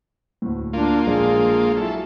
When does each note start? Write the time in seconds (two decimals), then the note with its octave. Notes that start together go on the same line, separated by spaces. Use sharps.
0.42 D2 A2
0.73 A#3 D4 F4
1.05 A#1 G#3 D4 G#4
1.77 F#3 E4 A4